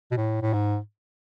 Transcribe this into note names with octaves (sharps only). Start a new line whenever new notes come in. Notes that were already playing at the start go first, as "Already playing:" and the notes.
B2
A2
A2
G#2